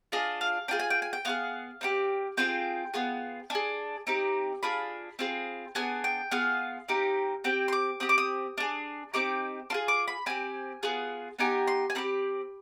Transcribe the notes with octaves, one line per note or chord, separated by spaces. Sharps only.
D4 F4 G#4 D#5
F5
D4 F4 G#4 G5
G#5
G5
G#5
G5
B3 F4 G#4 F5
C4 D#4 G4
C4 F4 G#4 G5
B3 F4 G#4
D4 G#4 G#5
C4 D#4 G4
D4 F4 G#4 B5
C4 F4 G#4
B3 D4 G#4 G#5
G5
B3 F4 G#4 F5
C4 D#4 G4
C4 G4 G5
C6
D6
C4 G4 D#6
D6
D#6
D4 G#4
C4 D#4 G4 D6
D4 F4 G#4 C6
D6
B5
C4 G4 G#5
B3 F4 G#4
B3 D#4 G4 G#5
C6
G#5
C4 D#4 G4 B5